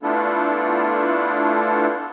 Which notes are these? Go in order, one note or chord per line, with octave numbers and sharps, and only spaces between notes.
A3 B3 D4 E4 F4 A4